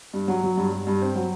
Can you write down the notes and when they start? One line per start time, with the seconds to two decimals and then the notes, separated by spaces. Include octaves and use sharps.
0.13 G2
0.28 F#3
0.44 F#3
0.57 G2
0.73 G2
0.87 G2
1.02 C4
1.16 F#3